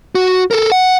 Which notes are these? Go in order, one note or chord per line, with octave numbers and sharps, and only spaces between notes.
F#4
A4 A#4
F#5